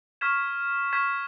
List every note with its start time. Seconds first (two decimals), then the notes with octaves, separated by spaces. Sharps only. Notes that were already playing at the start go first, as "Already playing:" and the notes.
0.21 C#6 F6 G#6 B6 E7
0.93 C#6 F6 G#6 B6 E7